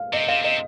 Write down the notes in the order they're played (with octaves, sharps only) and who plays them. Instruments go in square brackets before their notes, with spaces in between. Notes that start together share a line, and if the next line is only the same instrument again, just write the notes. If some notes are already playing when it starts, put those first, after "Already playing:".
Already playing: [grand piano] F5
[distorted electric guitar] C3 [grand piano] D#5
[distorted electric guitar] C3 [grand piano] F5
[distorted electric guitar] C3 [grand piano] D#5